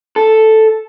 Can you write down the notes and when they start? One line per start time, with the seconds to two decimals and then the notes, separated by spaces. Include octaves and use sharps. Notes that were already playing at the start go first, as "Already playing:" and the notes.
0.16 A4